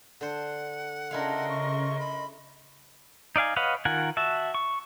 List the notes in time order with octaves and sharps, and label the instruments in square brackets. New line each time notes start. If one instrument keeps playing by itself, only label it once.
[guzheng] D3 C5 [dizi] F#5
[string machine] C#3 [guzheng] D4 E4 F5 [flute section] A#4 D#5 C6
[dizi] C#6
B5
[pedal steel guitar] D#4 D5 F5 G#5
B4 C#5 D#5 F5 F#5
D#3 F4 A#4 F#5 G#5
F#4 E5 A5
C#6